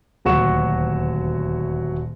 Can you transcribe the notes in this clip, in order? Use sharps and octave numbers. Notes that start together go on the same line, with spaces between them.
D#1 D2 F#3 F#4 C#6 E7